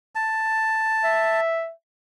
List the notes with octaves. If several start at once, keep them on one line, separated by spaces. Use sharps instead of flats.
A5
E5